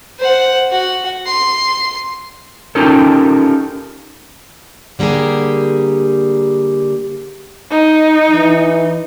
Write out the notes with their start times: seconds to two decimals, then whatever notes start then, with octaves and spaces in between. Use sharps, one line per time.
0.20 C5 F#5
0.71 F#4 F#5
1.27 C6
2.75 C#4 D#4 F4 G4 A4 A#4
4.99 D3 G3 A#3 G4 G#4
7.71 D#4
8.31 E3